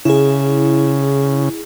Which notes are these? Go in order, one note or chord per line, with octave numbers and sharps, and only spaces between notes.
C#3 E4 G#4